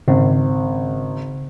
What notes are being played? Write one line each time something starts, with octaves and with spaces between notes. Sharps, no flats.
G#1 C#3